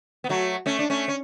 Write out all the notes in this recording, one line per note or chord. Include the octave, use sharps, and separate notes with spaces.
B3
F#3 A3
A3 C#4
D4
A3 C#4
C#4